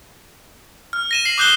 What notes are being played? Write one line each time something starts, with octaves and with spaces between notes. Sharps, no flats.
F6
A#6 D#7 E7
C7 F#7
D6 D#6 F#6 G6 D#7 G7